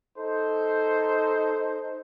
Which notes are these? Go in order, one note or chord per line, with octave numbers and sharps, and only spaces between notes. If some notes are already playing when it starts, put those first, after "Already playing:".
D#4 A4 C5